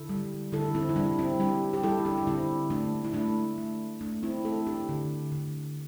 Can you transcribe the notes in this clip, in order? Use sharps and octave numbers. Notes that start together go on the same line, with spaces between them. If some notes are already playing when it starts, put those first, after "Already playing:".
Already playing: D3 E4 A4
G3
D3 E4 A4
C4 E4
E4
G3 D4
C4 E4
G3 D4 G4
G4
G3 E4 A4
D4 G4
D4
D3 C4 E4
A3 D4
E4
A3 D4
A3
A3 D4
C4 E4
A3 E4 A4
D4 G4
D3
D3